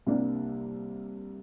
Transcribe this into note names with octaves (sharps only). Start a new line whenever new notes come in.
C2 C3 G3 A#3 D4